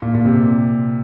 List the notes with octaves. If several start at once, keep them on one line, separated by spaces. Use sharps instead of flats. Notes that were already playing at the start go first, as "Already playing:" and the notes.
A#2
A#2
C3